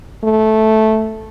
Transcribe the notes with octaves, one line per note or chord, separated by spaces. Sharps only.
A3